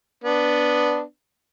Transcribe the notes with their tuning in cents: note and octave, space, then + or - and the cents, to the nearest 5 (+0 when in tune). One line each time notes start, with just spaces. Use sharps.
B3 +0 D4 +0